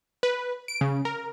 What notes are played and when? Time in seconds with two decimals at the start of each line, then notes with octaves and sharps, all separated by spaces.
0.23 B4
0.68 D7
0.81 C#3
1.05 A#4